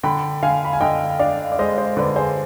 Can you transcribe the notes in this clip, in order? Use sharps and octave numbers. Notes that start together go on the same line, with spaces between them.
D3 G5 B5
D3 F5 G#5
B5
G#5
D3 D#5 G5
D4 D5 F5
D5
G#3 C5 D#5
C5 D#5
D3 B4 D5
G#4 C5